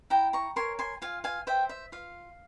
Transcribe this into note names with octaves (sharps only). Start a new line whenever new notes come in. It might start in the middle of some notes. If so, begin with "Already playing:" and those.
E4 G5 A#5
A#5 C#6
A#4 C#5 G#5 C6
G#5 C6
F4 F5 G#5
F5 G#5
C5 E5 G5
E5
F4 F5